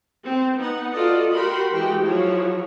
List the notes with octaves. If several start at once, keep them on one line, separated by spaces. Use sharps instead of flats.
C4
B3 D#4 B4 F#5
F4 F#4 A4 D5 D#5
F#4 G4 A#4 B5 C6
E3 G#3 F#4 G4 G5
F3 F#3 E4 F#4 G#4 C#5